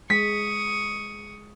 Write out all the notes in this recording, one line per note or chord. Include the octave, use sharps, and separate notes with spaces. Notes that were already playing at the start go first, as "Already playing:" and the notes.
G#3 C#6 D#6 B6